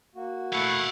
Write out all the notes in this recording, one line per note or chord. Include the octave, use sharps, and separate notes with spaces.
A#3 F#4
A3 E4 F5 F#5